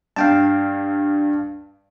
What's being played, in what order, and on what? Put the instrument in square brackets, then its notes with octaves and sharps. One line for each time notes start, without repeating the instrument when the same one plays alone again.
[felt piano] G2 [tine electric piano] F5 G5 A5